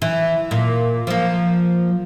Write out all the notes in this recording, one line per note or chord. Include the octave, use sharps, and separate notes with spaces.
E3
A#2
F3 A#3